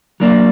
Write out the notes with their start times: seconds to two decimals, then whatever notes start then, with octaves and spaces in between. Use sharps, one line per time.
0.20 F#3 A#3 D4